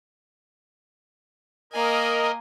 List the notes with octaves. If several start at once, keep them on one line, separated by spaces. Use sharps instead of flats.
A#3 A#4 D#5 G#5